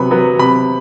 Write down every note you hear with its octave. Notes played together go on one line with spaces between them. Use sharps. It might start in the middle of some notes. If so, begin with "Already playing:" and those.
Already playing: C3 F#3 B3 B5
F#3 B3
C3 B5